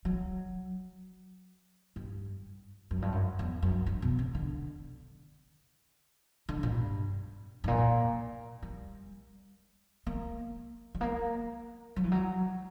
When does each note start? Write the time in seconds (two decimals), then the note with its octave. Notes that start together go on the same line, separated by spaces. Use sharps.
0.05 F#3
1.96 G2
2.91 F#2
3.02 G2
3.12 F#2
3.39 E2
3.63 F#2
3.86 G2
4.02 B2
4.19 C#3
4.35 D3
6.49 D3
6.63 A#2
6.72 G2
7.64 G2
7.68 A#2
8.63 G3
10.07 A#3
10.95 G3
11.01 A#3
11.96 F#3
12.04 E3
12.12 F#3